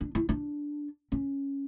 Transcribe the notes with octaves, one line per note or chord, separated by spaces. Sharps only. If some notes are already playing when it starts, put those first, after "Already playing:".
D4
E4
D4
C#4